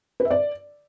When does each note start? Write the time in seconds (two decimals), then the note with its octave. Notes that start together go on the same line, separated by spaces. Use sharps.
0.20 B4
0.25 E5
0.31 D5